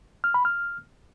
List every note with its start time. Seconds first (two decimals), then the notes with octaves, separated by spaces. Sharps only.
0.24 F6
0.34 B5
0.45 F6